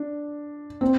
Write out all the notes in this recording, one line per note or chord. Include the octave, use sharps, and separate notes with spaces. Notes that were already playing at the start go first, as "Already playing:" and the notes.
Already playing: D4
C4